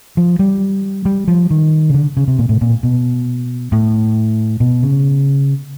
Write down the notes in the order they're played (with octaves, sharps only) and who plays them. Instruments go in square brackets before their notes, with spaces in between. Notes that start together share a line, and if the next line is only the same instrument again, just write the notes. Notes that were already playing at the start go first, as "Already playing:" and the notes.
[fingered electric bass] F3
G3
G3
F3
D#3
C#3
D3
C#3
C3
A#2
A2
A#2
B2
A2
B2
C#3